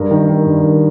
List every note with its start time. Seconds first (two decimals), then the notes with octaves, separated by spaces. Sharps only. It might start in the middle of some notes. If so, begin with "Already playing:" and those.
Already playing: G2 A#4
0.11 D#3
0.29 D#3
0.46 G2
0.63 D#3